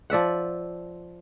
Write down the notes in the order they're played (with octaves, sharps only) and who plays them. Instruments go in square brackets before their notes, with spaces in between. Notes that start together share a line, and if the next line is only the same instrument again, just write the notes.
[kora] F3 D5 E5 F#5